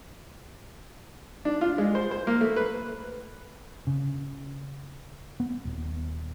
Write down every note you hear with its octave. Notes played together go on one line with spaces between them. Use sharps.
D4
F4
G#3
C5
C5
A#3
A3
B4
C#3
B3
D#1